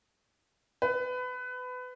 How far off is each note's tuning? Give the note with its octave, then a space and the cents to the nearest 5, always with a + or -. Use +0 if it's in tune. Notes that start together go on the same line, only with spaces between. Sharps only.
B4 +25